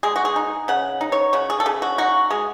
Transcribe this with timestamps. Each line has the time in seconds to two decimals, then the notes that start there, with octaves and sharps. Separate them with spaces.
0.03 G#3 G#4
0.16 F#4
0.25 G#4
0.36 D#4
0.68 C#3 F#5
1.01 D#4
1.12 C#5
1.33 C#3 F#4
1.50 G#4
1.60 A4
1.66 C#3 G#4
1.82 F#4
1.98 D#4 F#4
2.30 G#3 G#4